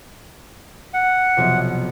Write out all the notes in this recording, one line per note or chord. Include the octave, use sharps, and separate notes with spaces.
F#5
B1 F2 C3